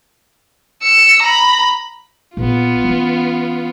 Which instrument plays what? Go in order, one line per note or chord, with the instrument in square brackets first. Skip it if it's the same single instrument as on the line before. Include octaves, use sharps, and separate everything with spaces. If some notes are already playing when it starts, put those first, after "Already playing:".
[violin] E6 C#7
A#5 B5
[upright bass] A#1 [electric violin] B3 F4
[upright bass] E3 C#4